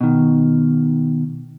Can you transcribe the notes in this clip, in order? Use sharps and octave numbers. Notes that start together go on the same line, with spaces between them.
B2 D#3